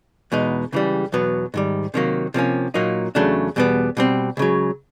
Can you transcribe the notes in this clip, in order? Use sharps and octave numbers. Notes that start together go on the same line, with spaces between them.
E2 B2 G#3 B3 D#4
C#2 C#3 E3 G3
E2 B2 F#3 B3
G#2 D#3 G3
C3 D#3 F#3 A#3
C3 F3 A#3 C#4
A#2 F#3 A#3 D#4
E2 C#3 F#3 A3 D4
E2 B2 G3 B3
B2 G3 C4
C#2 C#3 F#3